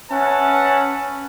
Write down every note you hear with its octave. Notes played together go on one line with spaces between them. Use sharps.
C#4 B4 E5 F#5 A5